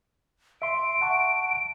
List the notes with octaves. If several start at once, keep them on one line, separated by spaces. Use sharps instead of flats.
E5 C6 D7
F#5 A5 C#6